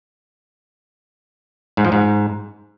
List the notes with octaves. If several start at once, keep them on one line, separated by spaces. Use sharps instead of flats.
G#2
F3
G#2